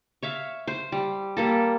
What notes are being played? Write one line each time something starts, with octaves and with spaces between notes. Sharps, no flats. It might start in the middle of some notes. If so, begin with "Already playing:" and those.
C#5 E5 F5
C5
G3
G3 A#3 A4